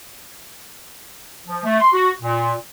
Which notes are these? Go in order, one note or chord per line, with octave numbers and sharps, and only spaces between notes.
F3
A3
C6
F#4
A#2